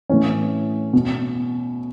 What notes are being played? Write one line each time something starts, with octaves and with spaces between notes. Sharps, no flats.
A2 E3 C#4
B2